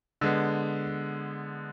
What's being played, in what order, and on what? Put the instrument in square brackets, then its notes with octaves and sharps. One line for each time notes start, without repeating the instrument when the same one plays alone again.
[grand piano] D3 G#3 B3